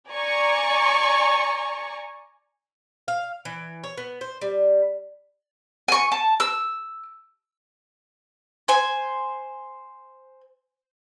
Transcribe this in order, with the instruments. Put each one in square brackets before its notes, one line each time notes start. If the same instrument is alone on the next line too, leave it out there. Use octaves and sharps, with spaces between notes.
[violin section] D5 G#5 A#5 C#6
[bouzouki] F5
E3
C#5
B3
C5
G3
[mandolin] G#5 C#6
A5
E6
C5 G#5